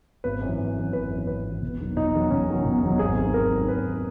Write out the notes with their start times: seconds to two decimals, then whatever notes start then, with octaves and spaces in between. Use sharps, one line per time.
0.24 G#1 B4
0.41 F#2 E3
0.58 G#1
0.77 F#2 E3
0.93 G#1 B4
1.10 F#2 E3
1.27 G#1 B4
1.45 F#2 E3
1.62 E1
1.80 E2 D#3 F#3
1.96 E1 D#4
2.13 E2 D#3 F#3
2.31 E1 C#4
2.49 E2 D#3 F#3
2.65 E1
2.83 E2 D#3 F#3
2.99 G#1 G#4
3.17 F#2 D#3
3.34 G#1 A#4
3.52 F#2 D#3
3.69 G#1 B4
3.87 D#3